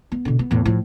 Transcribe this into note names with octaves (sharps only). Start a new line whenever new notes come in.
B3
B2 D3
B3
E2 A2
A2 F3